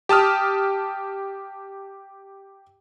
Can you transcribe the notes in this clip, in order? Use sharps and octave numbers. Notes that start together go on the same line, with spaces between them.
G4 A5 D#6 F6